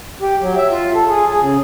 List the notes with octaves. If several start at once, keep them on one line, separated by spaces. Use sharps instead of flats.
G4
F#3
E5
F4
A4
G#4
G#4
C#3